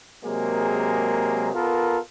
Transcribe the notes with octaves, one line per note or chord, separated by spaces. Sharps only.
C3 F#3 G#3 A#3 G#4 A#4
B3 F4 A4 A#4